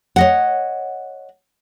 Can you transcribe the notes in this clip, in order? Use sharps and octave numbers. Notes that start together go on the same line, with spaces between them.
C#5 D#5 F#5